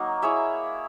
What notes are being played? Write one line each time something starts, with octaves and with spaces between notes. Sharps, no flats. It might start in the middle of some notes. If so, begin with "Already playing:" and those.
Already playing: F#3 A#3 D#4
E4 G#4 C#5 E5